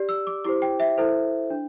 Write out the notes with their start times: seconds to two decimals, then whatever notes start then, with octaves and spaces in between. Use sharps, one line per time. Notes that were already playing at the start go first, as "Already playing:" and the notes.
Already playing: G4 D5
0.09 E6
0.27 D6
0.44 E4 G4 C5 D6
0.62 G5
0.80 E5
0.98 E4 A4 C5
1.50 D4